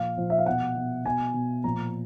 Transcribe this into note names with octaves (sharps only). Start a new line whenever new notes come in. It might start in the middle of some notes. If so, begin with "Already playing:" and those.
Already playing: A#2 F3 F5
A#2 F3
E5
F5
B2 F#5
B2
B2 G#5
B2
A#2 F3 A#5